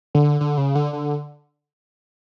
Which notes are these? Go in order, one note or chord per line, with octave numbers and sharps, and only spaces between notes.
D3
D3
C#3
D3
D3